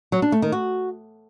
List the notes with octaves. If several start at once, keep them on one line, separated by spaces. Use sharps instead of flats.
F#3
D4
A3
D#3
F#4